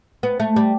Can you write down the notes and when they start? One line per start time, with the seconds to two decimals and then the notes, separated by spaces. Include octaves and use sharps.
0.23 B3
0.40 A3
0.56 G3